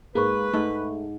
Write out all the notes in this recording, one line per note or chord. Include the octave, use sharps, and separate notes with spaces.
G#2 A#3 G#4 B4 B5 C#6
G#2 A3